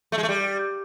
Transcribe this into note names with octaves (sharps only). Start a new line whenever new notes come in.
A3
G#3
A3
G3